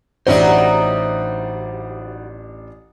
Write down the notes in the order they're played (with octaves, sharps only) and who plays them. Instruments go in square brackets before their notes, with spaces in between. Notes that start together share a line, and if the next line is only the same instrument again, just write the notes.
[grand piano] A1 D4 [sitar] F#3 G3 D#4 [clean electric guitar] C5 E5